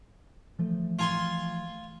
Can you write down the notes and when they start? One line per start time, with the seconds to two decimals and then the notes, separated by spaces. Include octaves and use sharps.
0.59 E3 F3 A3
0.99 F4 G#5 C6